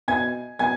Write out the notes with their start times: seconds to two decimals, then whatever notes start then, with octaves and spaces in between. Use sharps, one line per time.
0.08 B2 G#5 G#6
0.59 B2 G#5 G#6